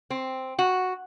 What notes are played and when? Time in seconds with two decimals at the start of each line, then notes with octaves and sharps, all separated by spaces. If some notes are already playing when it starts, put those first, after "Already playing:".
0.10 C4
0.59 F#4